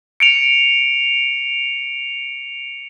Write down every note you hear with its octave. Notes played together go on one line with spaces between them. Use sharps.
C#7 D7 F7